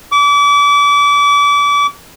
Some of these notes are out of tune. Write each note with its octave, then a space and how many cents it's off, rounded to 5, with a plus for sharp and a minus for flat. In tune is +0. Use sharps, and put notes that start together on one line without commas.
D6 -35